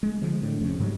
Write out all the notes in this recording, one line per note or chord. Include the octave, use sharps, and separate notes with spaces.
G#3
D3 F3 G#3
A2 D3
F1 F2 C#3
G#2 D#3 F#3 G3